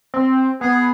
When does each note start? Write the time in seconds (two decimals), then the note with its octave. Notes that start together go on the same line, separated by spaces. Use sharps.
0.14 C4
0.61 B3 G#4